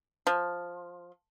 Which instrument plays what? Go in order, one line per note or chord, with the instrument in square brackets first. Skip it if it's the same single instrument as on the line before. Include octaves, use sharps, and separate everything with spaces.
[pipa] F3